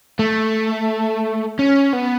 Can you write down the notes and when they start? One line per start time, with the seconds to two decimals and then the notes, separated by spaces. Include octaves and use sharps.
0.19 A3
1.59 C#4
1.93 B3